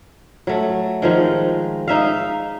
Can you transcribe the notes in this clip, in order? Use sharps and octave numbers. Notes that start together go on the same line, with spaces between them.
F#3 A3
D#3 F3 G#3
D#4 E5 F5